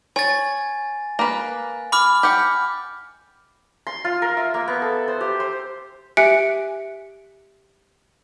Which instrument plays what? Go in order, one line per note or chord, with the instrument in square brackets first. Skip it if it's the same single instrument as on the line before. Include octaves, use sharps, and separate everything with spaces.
[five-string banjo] C#5 [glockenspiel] G#5 A6
[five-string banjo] A#3 B4
[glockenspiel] B5 D6 F6
[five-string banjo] G4 F#5
[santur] C6
F4
A#4
E5
A#3
B3
A4
C5
G4
C5
[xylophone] G4 E5 G#5 F#6 C#7 D7